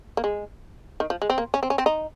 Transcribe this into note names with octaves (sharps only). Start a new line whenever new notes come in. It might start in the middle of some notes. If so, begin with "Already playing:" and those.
A#3
G#3
D#3
F3
G#3
C4
A#3
C#4
C4
C#4
C4
D#4